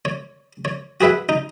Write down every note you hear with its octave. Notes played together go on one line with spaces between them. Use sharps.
C#5
C#5
F#4 G#4 B4 E5 F#5
D#4